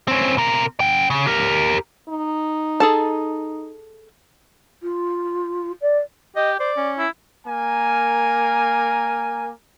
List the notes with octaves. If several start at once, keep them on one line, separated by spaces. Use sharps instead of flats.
C4 C#4
C3 A#4
C#4 G5
C#3
G4 A#4
D#4
G#4 A4 A5
F4
D5
G4 D#5
C5 D5
C#4
E4
A#3 A#4 G#5